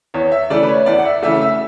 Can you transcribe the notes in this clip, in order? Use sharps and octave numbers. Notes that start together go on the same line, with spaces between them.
E2 C#5
E5
C#3 E3 A3 D5
B4
C#5
E2 D5
F#5
E5
C#3 E3 A3 E5
E5